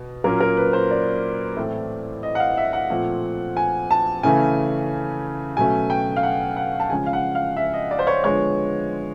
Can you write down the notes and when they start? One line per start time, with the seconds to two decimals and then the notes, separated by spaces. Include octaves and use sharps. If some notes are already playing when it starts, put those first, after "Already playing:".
Already playing: B2
0.24 A#2 F#3 A#3 C#4 A#4
0.40 A#4
0.57 B4
0.73 C5
0.91 D5
1.56 A2 E3 A3 C4
2.23 D#5
2.35 F#5
2.40 F5
2.57 E5
2.73 F#5
2.90 A#2 F3 A3 C4
3.57 G#5
3.91 A5
4.23 C#3 E3 A3 C#4 G#5
5.57 B2 F#3 A3 C#4 G#5
5.90 G5
6.16 F5
6.23 F#5
6.56 F#5
6.80 A5
6.90 C#3 F3 G#3 C#4 G#5
7.06 F5
7.13 F#5
7.35 F5
7.57 E5
7.74 D#5
7.91 D5
7.99 C5
8.07 C#5
8.24 D3 F3 G#3 B3 C#5